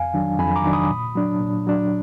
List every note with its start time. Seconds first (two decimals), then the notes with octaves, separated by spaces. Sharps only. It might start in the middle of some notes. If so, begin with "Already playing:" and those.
Already playing: F2 F5 G#5
0.14 D#3 F#3 D4
0.39 F2 G#5 B5
0.56 A#5 D6
0.65 D#3 F#3 D4
0.73 B5 D#6
0.90 A#2
1.15 F#3 D4
1.40 A#2
1.67 F#3 D4